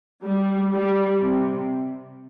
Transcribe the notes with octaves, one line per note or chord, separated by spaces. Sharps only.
G3
G3
C3